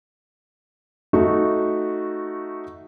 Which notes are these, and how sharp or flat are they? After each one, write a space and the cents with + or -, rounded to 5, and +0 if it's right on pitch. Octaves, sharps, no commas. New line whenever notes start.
A3 +0 D#4 +0 F#4 -5